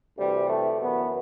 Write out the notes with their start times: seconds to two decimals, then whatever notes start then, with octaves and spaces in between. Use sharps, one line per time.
0.18 D2 C3 E3 G3
0.49 A3
0.81 F#2 E3 B3